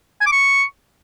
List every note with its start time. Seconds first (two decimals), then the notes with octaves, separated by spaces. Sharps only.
0.21 G#5
0.26 D6
0.32 C#6